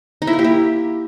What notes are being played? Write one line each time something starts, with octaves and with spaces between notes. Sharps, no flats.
D#4
E4
A#3
G4
E4